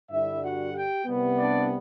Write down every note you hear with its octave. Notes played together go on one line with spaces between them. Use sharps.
G2 D3 G3 E4 E5
F#4 F#5
G4 G5
C2 C3 G3 B3
D4 D5